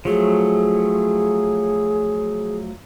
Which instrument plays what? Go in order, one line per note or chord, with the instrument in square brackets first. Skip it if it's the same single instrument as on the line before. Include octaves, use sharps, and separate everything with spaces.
[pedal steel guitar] F3 F#3 A3 [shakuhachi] G#4